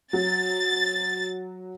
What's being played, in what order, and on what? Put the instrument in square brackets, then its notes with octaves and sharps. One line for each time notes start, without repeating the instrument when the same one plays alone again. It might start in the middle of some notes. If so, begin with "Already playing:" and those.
[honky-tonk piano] F#3 [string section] A6